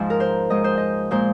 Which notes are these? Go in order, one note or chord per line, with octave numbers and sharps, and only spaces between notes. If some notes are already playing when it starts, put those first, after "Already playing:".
Already playing: G#2 F3 G#3
A#4
C5
G#2 G#3 D#5
C5
D#5
A#2 G#3 C5